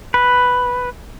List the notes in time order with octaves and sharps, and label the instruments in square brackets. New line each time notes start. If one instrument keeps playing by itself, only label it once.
[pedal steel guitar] B4